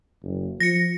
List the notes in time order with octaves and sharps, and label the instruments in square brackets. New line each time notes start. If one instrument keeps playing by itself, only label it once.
[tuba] F#1
[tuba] F3 [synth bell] A#6 C#7